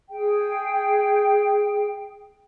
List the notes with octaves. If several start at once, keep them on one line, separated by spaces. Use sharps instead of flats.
G#4 G5